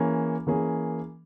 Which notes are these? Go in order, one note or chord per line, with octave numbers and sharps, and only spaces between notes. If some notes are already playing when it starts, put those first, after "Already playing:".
Already playing: E3 A#3 C#4 G#4
E3 A#3 C#4 G#4